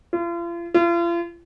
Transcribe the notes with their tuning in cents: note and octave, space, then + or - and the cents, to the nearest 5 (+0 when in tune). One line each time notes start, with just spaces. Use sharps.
F4 -40
F4 -40